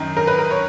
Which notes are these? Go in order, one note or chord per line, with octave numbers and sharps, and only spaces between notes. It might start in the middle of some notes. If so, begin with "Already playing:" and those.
Already playing: F#2 D#3 D#4
A#4
B4
A#4
C#5